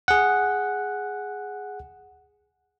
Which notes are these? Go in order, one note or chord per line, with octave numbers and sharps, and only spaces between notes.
G#4 F#5